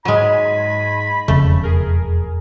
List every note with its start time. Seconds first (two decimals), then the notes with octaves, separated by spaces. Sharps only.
0.05 G#2 F#3 G#3 B5 G#6 D#7
1.28 E1 F2 C#3 A3
1.63 G#4 A#4